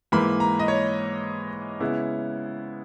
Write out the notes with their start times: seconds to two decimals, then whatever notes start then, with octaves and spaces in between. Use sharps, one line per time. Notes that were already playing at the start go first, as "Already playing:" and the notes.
0.12 G#2 E3 A#3 B5
0.40 A#5
0.59 D#5
0.68 C#5
1.80 C#3 G#3 B3 E4